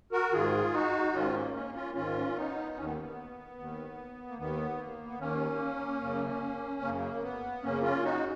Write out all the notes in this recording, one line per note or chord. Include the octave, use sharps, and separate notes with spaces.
F#4 A#4
G#2 D#3 F4 G#4
D#4 F#4
G#2 D#3 C#4 F4
A#3
A#3 C#4
C#4 F4
G#2 D#3 C#4 F4
B3 D#4
D#2 D#3 B3 C#4
A#3
B3
D#2 D#3
A#3
D#2 D#3 B3
A#3
B3
D#2 D#3 A#3 C#4
F#2 C#3
F#2 C#3 A#3
A#3
B3
F#2 C#3 A#3 C#4
C#4 F4
D#4 F#4